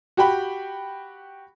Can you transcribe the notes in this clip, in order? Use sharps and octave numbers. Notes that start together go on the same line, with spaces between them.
F#4 G4 G5 B5